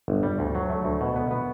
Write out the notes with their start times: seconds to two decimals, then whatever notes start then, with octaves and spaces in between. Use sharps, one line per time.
0.08 G1
0.23 G3
0.39 D2
0.55 F#3
0.70 A3
0.85 D2
1.01 B2
1.16 B3
1.31 B3